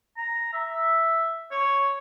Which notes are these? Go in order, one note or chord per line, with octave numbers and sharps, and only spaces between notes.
A#5
E5
C#5